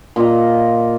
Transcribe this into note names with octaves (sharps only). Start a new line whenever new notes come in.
A#2 F4 D#5 A#5